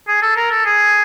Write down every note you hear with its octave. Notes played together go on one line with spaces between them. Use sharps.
G#4
A4
A#4
A4
G#4